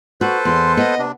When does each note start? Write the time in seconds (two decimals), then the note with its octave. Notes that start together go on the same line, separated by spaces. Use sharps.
0.21 F#4 A4 B4 C5
0.45 E2 C6
0.77 B3 D#5
0.99 C3 D4